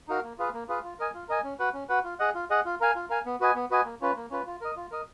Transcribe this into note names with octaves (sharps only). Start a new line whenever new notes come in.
D#4 F#4 A#4 F5
A#3
F4 G#4 B4 F5
A#3
F4 G#4 B4 F5
F4
A#4 D#5 G#5
F4
A#4 D#5 G#5
C#4
F#4 B4 F#5
C#4
F#4 B4 F#5
F4
G#4 D#5 F#5
F4
G#4 D#5 F#5
F4
A#4 F5 G#5
F4
A#4 F5 G#5
B3
F#4 B4 D#5 G#5
B3
F#4 B4 D#5 G#5
A#3
C#4 F4 B4
A#3
C#4 F4 B4
F4
A#4 D#5
F4
A#4 D#5